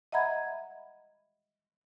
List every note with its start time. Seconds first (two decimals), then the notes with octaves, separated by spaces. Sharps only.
0.12 D#5 E5 F#5 A#5 B5 G#6